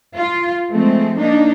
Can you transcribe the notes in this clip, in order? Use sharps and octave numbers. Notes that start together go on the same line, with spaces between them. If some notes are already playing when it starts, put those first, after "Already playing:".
F4
F3 G#3 A3 C4
A#3 D4 D#4